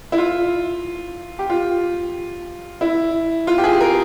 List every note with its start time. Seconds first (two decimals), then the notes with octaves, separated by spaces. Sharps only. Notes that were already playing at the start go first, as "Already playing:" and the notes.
0.12 E4
0.18 F4
1.39 G4
1.50 F4
2.81 E4
3.47 F4
3.58 G4
3.64 G#4
3.81 A#4